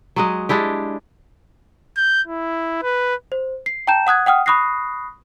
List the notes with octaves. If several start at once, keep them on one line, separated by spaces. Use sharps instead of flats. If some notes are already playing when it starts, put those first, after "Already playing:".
F#3 G#3 D#5
G#3 D4 E4 G4
G6
E4
B4
C5
C7
G5 A5 A#5 G6 E7
F#5 D#6 F#6 G#6
F#5 G5 D#6 F6
B5 C#6 D#6 F#6 A#6 C7